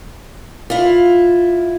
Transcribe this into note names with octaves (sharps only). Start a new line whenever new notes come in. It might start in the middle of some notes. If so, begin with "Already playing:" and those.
E4 F4